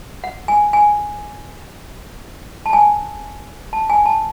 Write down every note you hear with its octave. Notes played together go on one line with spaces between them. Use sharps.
F#5
G#5
G#5
A5
G#5
A5
G#5
A5